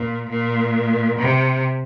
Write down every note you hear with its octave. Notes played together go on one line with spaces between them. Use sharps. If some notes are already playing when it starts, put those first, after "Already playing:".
Already playing: A#2
A#2
C3